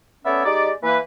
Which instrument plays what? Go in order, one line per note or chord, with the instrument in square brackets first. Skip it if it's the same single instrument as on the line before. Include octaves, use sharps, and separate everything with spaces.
[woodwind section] A3 B3 C#4 C#5 D5 E5
G#3 D#4 G4 D5
E3 A#3 B4